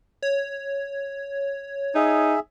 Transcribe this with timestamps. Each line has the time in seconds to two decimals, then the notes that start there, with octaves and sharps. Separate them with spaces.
0.22 C#5
1.95 D#4 G#4 E5